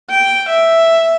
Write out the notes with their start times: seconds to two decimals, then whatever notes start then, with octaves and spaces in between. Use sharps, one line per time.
0.10 G5
0.49 E5